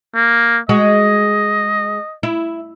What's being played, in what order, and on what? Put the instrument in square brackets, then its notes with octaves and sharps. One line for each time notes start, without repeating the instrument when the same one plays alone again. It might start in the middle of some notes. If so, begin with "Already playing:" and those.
[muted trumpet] A#3
[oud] G#3 F#4 [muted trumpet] D#5
[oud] E4